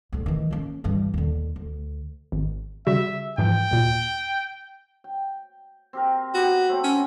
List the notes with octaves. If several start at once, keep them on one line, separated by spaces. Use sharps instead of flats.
D2 D3
D#3 E3
A#3 C#4
G2 E3
D#2 D3
D2
G#1
C#3 G3 F#4 E5
G#2 E3 F3 G5
D#2 A#2
G5
C4 G4 A#4
B3 F#4 G4
F#3 A3 C4
C#4